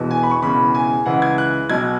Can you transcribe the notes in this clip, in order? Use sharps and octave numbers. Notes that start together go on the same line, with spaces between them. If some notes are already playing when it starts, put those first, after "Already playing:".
Already playing: E1 E2 B2
G#5
B5
C#6
E1 E2 C#3 B5
G#5
C#2 C#3 E3 F#5
G#6
F#6
B1 B2 F#3 G#6